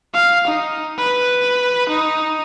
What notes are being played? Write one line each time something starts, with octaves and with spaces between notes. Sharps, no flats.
F5
D#4
B4
D#4